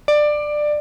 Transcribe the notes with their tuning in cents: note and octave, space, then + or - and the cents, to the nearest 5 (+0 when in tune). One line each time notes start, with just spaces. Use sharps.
D5 +20